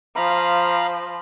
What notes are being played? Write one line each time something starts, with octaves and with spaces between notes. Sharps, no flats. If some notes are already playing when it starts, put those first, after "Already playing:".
F3 F5 A#5 B5